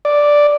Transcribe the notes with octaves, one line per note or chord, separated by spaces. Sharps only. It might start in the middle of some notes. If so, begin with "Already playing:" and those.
D5